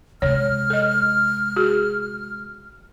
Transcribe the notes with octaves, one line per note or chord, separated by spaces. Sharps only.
C3 G#3 C#5 F6
A4 D#5
F#4 G#4